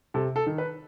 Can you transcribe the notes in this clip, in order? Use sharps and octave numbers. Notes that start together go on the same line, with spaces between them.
C3 A4
A4
D#3
B4